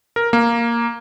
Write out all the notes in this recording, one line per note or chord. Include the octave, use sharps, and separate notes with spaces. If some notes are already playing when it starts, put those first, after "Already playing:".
A#4
A#3